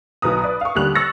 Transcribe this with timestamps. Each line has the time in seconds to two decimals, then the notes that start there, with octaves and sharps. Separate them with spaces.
0.22 B1 B2 B4 A#5 D#6
0.44 B4 D5
0.61 F5 C#6
0.75 D#2 D3 G3 F#6 F7
0.95 C#6 E6 F#6 A6 A#6 C#7